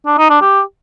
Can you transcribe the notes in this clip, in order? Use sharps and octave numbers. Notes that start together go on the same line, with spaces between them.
D4
D#4
D4
G4